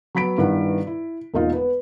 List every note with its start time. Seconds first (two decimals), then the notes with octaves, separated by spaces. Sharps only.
0.15 F#3 B3 B5 B6 D7
0.38 G2 D#3 B3 E4 B4 F#5
0.87 E4
1.34 E1 A#3 D#4 F4
1.53 B3 B4